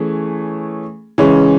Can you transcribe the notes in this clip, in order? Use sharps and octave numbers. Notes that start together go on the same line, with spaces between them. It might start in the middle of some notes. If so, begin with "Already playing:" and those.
Already playing: E3 A3 C#4 G#4
C#3 E3 G#3 C#4